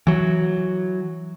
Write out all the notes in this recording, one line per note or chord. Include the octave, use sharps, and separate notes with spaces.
E3 F#3